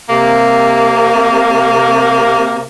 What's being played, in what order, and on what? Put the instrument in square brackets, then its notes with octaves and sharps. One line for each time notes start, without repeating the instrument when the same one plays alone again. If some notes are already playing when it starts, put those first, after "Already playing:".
[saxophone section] C3 A#3